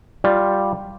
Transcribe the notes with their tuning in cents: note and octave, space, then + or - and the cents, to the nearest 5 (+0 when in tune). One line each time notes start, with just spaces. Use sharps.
G3 +0 F4 +0 D5 +0